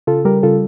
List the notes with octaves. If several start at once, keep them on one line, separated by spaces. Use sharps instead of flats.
C#3 F4 A4
G3 G4 A#4
C#3 F4 A4